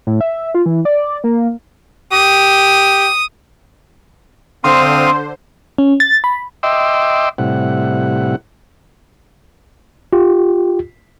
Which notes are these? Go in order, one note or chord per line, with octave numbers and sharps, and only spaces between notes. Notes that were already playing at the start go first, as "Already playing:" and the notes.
A2
E5
F4
E3
D5
A#3
G4 D#6
D3 C4 C5 F5 C6 D#6
C#4
A6
B5
D#5 E5 G5 C6 D6 E6
A2 C3 G3 E4 F#5
F4 G4